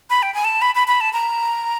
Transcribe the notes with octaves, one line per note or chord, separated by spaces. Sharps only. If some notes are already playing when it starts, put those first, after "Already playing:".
B5
G5
G#5
A5
B5
B5
B5
A5
A#5